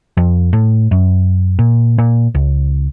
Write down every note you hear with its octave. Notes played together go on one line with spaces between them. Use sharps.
F2
A2
F#2
A#2
A#2
C#2